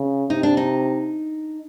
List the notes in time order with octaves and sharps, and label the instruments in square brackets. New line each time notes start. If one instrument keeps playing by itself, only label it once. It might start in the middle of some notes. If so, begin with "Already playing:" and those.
Already playing: [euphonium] C#3
[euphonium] C3 [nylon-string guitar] D#4
[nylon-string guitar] D4
D#4